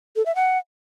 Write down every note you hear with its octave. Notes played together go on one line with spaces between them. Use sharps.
A4
E5
F#5